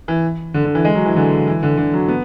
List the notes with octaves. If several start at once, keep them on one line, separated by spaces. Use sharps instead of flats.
E3
D3
D3
E3
G#3
F#3
E3
D3
E3
D3
D3
F#3
B3